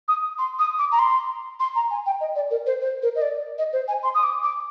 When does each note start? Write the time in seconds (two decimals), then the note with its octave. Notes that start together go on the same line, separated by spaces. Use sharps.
0.08 D#6
0.38 C6
0.59 D#6
0.78 D6
0.92 A#5
0.99 C6
1.60 C6
1.75 A#5
1.90 G#5
2.06 G5
2.20 D#5
2.36 D5
2.50 A#4
2.66 C5
2.81 C5
3.02 A#4
3.15 D#5
3.21 D5
3.58 D#5
3.73 C5
3.88 G#5
4.03 C6
4.14 D#6
4.23 D6
4.43 D6